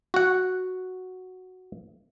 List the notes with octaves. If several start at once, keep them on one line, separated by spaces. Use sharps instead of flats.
F#4 F#5